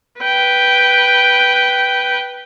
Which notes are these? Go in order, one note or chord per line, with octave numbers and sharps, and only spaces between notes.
B4 G5